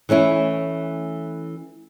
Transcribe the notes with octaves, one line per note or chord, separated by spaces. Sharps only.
E3 A3 C#4 E4